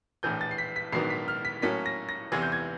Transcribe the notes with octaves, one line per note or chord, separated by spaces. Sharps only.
A#1 A2 E3 G6
A6
C7
B6
B6
A#1 G#2 D#3 F#3 B3 C7
B6
F6
B6
A2 F#3 A#3 C#4 B6
A#6
A#6
E2 C3 E3 G#6
G6
G#6